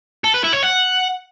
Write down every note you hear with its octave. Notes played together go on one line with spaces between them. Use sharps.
A4
B4
E4
C#5
F#5